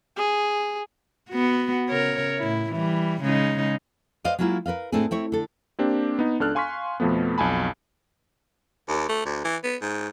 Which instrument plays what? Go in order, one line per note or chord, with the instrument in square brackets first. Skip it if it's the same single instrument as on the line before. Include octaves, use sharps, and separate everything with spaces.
[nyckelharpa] G#4
[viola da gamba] B3 F#4
C#3 A#4 C#5
A2 E4
E3 G3
C#3 G#3 D#4
[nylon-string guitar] B4 C5 D5 D#5 F5
F#3 G#3 A#3 E4 F4
A#4 B4 D#5 F5
A2 A3 C4 D4 G#4
C4 E4 C#5
D3 A4
[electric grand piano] A#3 C4 D4 G4
B3 D#4
C#2 D4 A4 F6 F#6
F5 G#5 C6 C#6 F6 B6
F2 B2 F3 A3 B3
B1 F2 G#5 A5 B5
[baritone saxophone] D#2
A3
D2
E3
B3
G#2